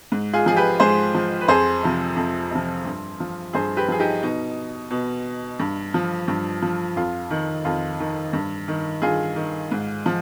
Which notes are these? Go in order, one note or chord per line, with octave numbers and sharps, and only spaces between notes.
G#2
F4 G#4
F3 G#4
G4 B4
G#2 G#4 C5
F3
B4
F2 G#4 C5
C3 F3
F2
C3 F3
G2
F3
G2 G#4 C5
G4 B4
F3 G#4
D#4 G4
B2 D#4
B2
G2
F3
G2
F3
F2 F4
D#3
F2 F4
D#3
G2
D#3
G2 F4 G#4
D#3
G#2
F3